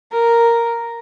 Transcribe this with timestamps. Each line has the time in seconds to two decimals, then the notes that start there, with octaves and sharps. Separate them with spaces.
0.12 A#4